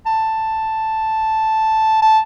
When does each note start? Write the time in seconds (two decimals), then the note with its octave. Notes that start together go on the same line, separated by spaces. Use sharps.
0.06 A5
2.02 A5